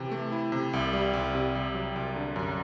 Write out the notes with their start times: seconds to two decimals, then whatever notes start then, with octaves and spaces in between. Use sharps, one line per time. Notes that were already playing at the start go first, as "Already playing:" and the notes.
Already playing: C3 E3 C4
0.11 A3
0.32 E4
0.52 C3
0.73 C2
0.93 G3
1.13 C2
1.35 C3
1.55 C2
1.75 F#3
1.96 C2
2.16 D3
2.36 F#2